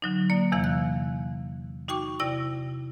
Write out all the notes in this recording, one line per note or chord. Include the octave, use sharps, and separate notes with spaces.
D3 F#3 D#4
A#3 D5
E2 C3 E3 F5
F#6
D#4 F#4 G5 C#6 D6
C3 E4 D5 G5 A#6